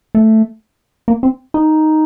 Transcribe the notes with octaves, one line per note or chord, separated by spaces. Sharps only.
A3
A#3
C4
D#4